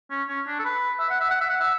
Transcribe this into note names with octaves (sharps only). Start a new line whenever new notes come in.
C#4
C#4
D4
A4
B4
E5
F#5
E5
F#5
E5
F#5
E5